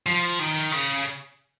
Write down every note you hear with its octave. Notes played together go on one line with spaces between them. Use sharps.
F3
D#3
C#3